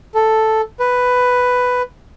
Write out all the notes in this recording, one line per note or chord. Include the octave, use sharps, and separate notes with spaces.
A4
B4